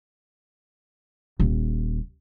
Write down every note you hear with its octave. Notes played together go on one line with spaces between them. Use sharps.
D#1